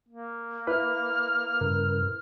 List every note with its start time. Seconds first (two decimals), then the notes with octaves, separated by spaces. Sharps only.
0.09 A#3
0.67 E4 B4 B5 F6
1.61 G2 C#3 A#4